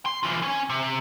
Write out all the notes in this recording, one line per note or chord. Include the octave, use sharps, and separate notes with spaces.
C6
E3 F4
C#4 G#5
C3